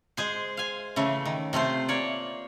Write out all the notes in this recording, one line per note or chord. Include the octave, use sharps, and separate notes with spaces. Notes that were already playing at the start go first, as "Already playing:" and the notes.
G#3 G#4 C5
F5 G#5
C#3 E3 A3
D#3
C3 A3 F4 C5
A#3 C#5 D5